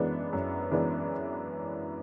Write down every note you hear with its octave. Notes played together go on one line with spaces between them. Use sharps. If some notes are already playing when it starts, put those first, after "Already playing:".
Already playing: F#2 E3 G#3 B3 D4
F#2
E3 G#3 B3 D4